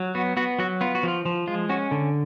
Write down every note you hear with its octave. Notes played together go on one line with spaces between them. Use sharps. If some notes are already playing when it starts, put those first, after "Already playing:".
Already playing: F#3
B3 F#4
B3 F#4
F#3 F#4
B3 F4
F#4
F3 F4
F3
G#3 F4
C#4 F#4
D3